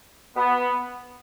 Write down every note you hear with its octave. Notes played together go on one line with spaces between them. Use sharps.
B3